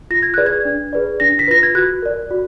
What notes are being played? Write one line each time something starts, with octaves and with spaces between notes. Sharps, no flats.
F4 A#6
G#6
G#4 B4 D5 F#6
G#6
D4
G#4 B4 D5
D4 A#6
B6
F4 B4 A#6
G#6
F#4 F#6
A#4 D5
F#4